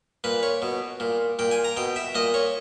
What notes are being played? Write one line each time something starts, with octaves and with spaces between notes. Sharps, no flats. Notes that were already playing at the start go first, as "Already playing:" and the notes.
A#2 B4
C#5
B2
A#2
A#2 G5
G#5
A#5
B2 G5
E5
A#2 D#5
C#5